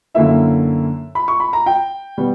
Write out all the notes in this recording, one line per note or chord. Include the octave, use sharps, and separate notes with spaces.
F#2 D3 A#3 E4 E5
B5
C#6
B5
A#5
G5
B2 G3 B3